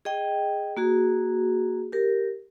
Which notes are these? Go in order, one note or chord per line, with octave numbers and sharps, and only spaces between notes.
G#4 D#5 G5
A#3 F#4 G#4
G4 A#4